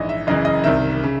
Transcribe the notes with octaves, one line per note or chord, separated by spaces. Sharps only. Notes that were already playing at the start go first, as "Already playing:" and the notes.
Already playing: A#1 G#2 E3 D#5
E5
F#1 F#2 C#3 E3 D#5
D#5
C2 C3 D#3 E5
C#3